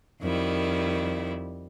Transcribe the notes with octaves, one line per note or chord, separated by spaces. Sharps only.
F2 D#3 G3 E4